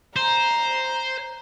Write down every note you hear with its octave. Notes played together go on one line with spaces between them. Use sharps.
C5 A#5